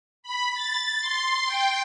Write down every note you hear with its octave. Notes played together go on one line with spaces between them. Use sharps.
B5
A6
C6
G5